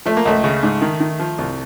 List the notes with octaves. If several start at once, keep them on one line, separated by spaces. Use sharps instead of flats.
F3 A3
A#3
C#2 A3
C#3
G#2
D#3
D#3
F3
C2